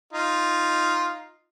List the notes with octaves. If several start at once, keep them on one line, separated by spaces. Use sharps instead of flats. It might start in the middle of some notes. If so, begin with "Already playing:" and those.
D#4 F4